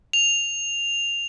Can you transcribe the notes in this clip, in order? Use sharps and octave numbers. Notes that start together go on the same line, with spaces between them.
F7